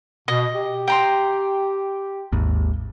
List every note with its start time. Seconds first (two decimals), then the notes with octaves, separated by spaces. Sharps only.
0.28 B2 D#5
0.54 G4
0.88 G5 A#5 C6
2.33 G#1 D#2